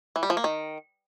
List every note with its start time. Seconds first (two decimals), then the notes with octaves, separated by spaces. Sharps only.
0.16 E3
0.23 G3
0.30 F3
0.37 A#3
0.44 D#3